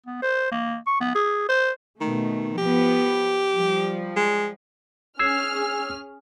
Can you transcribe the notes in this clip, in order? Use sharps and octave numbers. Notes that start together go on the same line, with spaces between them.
B3
C5
A#3
C#6
B3
G#4
C5
B2 D#3 A3
F3 B3 G4
F3 G3
G#3
C#4 G#4 E6 F6 G#6 C7